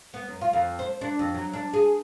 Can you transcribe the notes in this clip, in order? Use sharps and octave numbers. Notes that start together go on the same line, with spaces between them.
B3
F#2
F4
F2
C5
D4
F2
F#3
D4
G#4